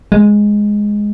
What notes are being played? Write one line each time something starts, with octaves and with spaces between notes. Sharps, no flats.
G#3